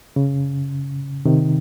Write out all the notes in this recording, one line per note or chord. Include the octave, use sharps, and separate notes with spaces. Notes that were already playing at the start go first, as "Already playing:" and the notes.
C#3
C3 D#3